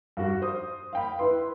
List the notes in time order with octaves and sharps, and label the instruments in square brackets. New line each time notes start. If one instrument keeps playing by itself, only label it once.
[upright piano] G2 F#4
C5 D#6
F5 G5 B5
[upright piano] E4 C6 [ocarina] B4